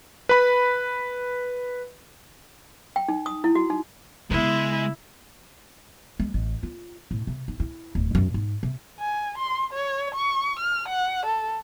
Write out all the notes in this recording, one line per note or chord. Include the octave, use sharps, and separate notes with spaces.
B4 B5
G5
D#4
D#6
E4
F#4
D#4
C#3 G#3 B3 E4
G#3
A1
F4
A2
C3
D#4
E4
D1
F#2
G#2
C3
G#5
C6
C#5
C#6
F6
F#5
A4